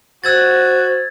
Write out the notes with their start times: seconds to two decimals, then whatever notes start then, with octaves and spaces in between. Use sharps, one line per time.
0.24 F#4 C5 E6 G#6 A6